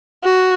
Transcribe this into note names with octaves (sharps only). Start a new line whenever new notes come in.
F#4